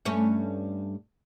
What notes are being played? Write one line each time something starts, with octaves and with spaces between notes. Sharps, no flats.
G2 A3 C#4